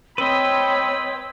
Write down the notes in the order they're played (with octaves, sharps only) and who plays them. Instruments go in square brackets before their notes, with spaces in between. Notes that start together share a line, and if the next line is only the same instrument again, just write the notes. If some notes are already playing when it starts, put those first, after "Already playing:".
[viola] C4 [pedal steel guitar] B4 D#5 [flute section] C#5 G5 E6 [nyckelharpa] B5